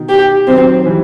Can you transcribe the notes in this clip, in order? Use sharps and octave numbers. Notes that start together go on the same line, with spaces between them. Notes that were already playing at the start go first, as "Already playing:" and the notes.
Already playing: B2 D#3
G4
D#3 F#3 C4
E3 G3